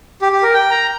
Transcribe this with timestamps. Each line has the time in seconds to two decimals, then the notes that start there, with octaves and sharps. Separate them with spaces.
0.22 G4
0.32 G4
0.43 A#4
0.54 G5
0.70 A#5